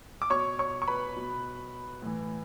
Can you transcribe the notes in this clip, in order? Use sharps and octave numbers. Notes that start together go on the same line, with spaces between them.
D6
B2 C#5 C#6
C#5 C#6
C#6
B4 B5
B2
A2 E3